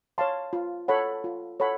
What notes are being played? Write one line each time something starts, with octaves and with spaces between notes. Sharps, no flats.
C#5 F5 A5 C6
F4
A4 C#5 F#5 B5
F4
A4 C#5 F#5 B5